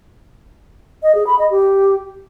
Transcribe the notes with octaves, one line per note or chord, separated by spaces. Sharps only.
D#5
G#4
B5
D#5
G4